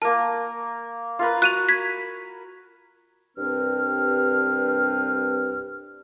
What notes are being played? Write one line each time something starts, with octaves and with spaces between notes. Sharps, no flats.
A#3 A#4 A5
F4 A#4 B4
F#4 F#6 D#7 F7
G#6 B6
C2 G2 C4 D4 B4 F6